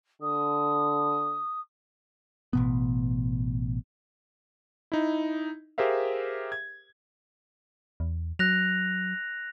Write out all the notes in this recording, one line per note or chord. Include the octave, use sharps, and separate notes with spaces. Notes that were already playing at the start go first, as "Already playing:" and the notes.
D3 D#6
A1 B2 B3
D#4 E4
G4 G#4 A#4 C5 E5 F5
G#6
E2
F#3 F#6 A#6 F7